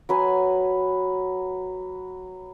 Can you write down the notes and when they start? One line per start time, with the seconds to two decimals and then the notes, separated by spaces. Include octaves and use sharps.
0.09 F#3 B4 G#5